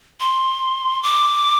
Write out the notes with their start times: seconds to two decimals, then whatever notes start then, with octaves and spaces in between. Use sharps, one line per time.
0.20 C6
1.03 D6